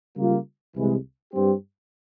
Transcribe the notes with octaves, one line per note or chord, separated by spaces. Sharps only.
C#3 G3 A#3 F4
C2 C3 E3 G#3
G2 G3 C4 G4